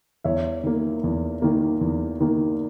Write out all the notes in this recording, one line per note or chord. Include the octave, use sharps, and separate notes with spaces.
E2 C#5 E5
D#3 A#3
E2
D#3 A#3
E2
D#3 A#3